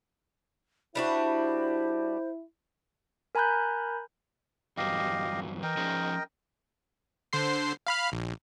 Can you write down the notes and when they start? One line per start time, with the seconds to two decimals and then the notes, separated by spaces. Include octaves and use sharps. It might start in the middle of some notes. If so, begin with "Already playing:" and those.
0.95 G3 D4 E4 F#4 C5
3.35 A#4 G#5 A#5 B5 F#6 G6
4.77 E2 G2 F#3 G4 D#5 F5
5.63 E3 A#4 D#5 G5
5.77 F3 C#4 G#4
7.33 D3 C5 C7
7.87 F5 B5 F6
8.12 A#1